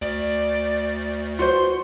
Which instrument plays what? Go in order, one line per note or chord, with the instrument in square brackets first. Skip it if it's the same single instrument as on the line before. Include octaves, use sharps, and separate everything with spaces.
[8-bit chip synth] D2 [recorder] D5
[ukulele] F#4 B4 C5 [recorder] C6